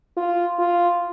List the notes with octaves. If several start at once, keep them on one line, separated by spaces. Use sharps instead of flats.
F4
F4